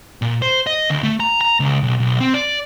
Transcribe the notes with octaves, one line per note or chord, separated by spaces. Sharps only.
A#2
C5
D#5
D2
A3
A#5
A#5
C#2
B1
B1
C4
D5